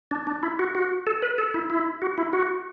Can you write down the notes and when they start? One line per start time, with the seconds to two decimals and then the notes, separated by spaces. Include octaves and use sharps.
0.11 D4
0.27 D4
0.43 E4
0.59 F#4
0.75 F#4
1.07 A4
1.22 B4
1.38 A4
1.54 E4
1.70 E4
2.02 F#4
2.18 E4
2.33 F#4